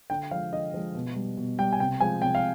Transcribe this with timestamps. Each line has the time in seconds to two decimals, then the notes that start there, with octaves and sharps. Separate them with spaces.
0.10 D3 G5
0.31 F3 F5
0.35 G#3
0.52 D3 D#5
0.74 F3 G#3
0.95 B2
1.16 G3
1.37 B2
1.59 G3 G5
1.72 G#5
1.80 C3 G5
2.00 F3 G#3 G#5
2.22 C3 G5
2.35 F5